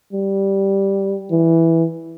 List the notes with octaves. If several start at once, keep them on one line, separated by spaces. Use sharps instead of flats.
G3
E3